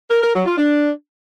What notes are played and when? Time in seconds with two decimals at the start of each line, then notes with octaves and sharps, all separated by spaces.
0.11 A#4
0.22 A#4
0.34 F#3
0.46 F4
0.58 D4